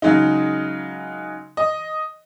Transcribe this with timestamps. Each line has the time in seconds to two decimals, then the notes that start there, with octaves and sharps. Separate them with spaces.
0.02 C#3 F#3 G#3 D#4
1.57 D#5